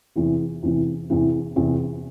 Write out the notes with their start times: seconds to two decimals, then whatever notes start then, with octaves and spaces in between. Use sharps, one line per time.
0.16 E2 C3 E3
0.63 E2 C3 E3
1.10 E2 C3 E3
1.56 E2 C3 E3